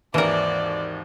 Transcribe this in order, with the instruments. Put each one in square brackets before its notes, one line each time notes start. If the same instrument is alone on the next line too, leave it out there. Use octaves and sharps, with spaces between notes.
[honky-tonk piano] G#1 D#2 [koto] E3 A#4 [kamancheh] D5